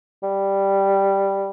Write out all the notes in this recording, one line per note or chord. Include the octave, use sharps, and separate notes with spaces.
G3